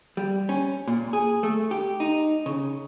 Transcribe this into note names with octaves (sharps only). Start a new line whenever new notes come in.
G3
C#4
A#2
G#4
A3
G4
D#4
C#3